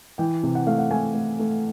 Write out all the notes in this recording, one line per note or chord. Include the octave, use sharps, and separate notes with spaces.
E3 G5
C3
F#5
A3 F5
F#5
A3 G#5
A3
A3